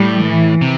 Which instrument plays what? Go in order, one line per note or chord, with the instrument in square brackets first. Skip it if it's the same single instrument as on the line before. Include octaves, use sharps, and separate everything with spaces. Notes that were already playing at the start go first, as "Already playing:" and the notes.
Already playing: [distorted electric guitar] A2 [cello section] G3
[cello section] E3
[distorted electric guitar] C3